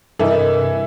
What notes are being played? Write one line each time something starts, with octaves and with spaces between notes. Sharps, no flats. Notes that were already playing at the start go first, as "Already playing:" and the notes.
G2 C3 E3 E4 A4 A#4 D#5